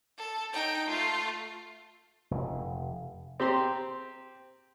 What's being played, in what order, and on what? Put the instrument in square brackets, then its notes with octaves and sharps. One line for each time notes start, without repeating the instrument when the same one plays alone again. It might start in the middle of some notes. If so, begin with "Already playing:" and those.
[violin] A4
D#4 G5
A3 F4
[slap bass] F1
[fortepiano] C4 G4 A#5 C6